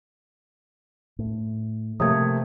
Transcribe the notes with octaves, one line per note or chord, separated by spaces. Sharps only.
A2
C3 F3 A3 A#3 D#6 G#6